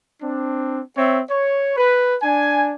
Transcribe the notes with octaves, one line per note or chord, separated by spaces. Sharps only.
C4 D4
C4 C#5 E5
C#5
B4
D4 G#5